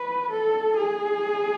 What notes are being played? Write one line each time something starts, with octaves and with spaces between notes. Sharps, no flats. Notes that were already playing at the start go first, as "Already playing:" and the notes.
Already playing: B4
A4
G#4